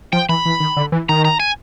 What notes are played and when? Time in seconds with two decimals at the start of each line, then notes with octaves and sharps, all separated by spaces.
0.13 F3 G5
0.29 E3 B5
0.45 E3
0.60 D#3
0.77 D3
0.92 E3
1.09 D#3 A#5
1.25 A#5
1.40 G#5